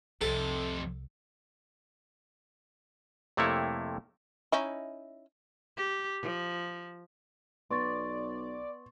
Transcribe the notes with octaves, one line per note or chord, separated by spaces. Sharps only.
C2 F2 C3 A4
F2 C3 A3 A#3 E4 C#5
C#4 D#4 E4
G4
F3
B1 B3 D5 C6 C#6 A6